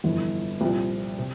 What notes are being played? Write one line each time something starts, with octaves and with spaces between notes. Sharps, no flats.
G1 F2 E3
C2 A#2 F3 C4
C3